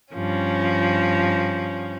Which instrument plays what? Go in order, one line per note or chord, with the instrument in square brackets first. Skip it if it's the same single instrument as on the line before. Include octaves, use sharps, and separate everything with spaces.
[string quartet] G2 F3 C#4